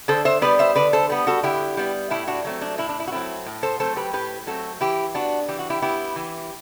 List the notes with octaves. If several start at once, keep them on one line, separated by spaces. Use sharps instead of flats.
D3 A4 C5
C5 E5
G3 B3 B4 D5
C5 E5
D3 B4 D5
A4 C5
G3 B3
F#4 A4
D3 E4 G4
G3 B3
A2 E4 G4
D4 F#4
F#3 A3 C4
D4
A2 E4
D4
E4
F#4
F#3 A3 C4 E4
A2
A4 C5
F#3 A3 C4 A4 C5
G4 B4
A2 G4 B4
F#3 A3 C4 F#4 A4
E3 E4 G4
B3 D4 F#4
E3 G4
F#4
E4 G4
B3 E4 G4
E3